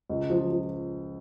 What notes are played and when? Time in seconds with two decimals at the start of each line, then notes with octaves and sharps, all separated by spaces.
0.10 C#2
0.30 F3
0.50 F3